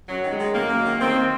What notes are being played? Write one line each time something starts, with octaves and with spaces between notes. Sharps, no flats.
F#2 F#3
D#3
G#3
D#3
F#2 A#3
F#2
D#3
D#3 C4